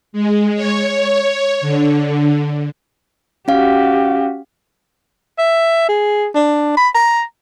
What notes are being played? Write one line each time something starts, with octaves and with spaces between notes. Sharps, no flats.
G#3
C#5
D3
C#4 F#4 G4 F5
E5
G#4
D4
B5
A#5